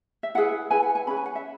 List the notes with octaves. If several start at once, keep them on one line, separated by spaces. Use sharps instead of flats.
E5
E4 G#4 B4 F#5
E4 G#4 B4 G#5
F#5
G#5
C#4 E4 G#4 B4 B5
G#5
F#5
E5